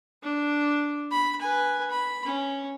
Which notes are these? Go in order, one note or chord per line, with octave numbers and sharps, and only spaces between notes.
D4
B5
B4 G#5
B5
C#4